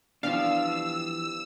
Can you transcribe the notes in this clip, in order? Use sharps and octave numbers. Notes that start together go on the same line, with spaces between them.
E3 F3 G3 B3 D4 F5 E6